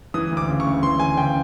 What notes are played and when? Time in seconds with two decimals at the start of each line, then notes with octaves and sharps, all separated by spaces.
0.14 E3 D#6
0.31 D2
0.37 D6
0.48 C#3
0.60 C#6
0.66 D2
0.83 E3 C6
1.00 D2 G#5
1.17 C#3 G5